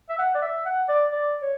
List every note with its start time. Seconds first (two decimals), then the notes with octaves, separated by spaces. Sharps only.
0.09 E5
0.19 F#5
0.35 D5
0.42 E5
0.66 F#5
0.88 D5
1.12 D5
1.42 C#5